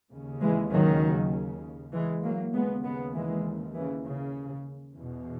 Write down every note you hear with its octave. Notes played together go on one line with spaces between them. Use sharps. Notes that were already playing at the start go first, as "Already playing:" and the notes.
D#2 C#3
E3 G#3
D#3 F#3
E3 G#3
F#3 A#3
D#2 C#3 G#3 B3
G#3 B3
E3 G#3
C#3 E3
C#3
E2 B2